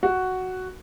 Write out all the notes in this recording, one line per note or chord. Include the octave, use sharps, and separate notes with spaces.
F#4